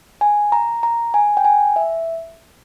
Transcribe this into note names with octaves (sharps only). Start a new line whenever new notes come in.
G#5
A#5
A#5
G#5
G5
G#5
E5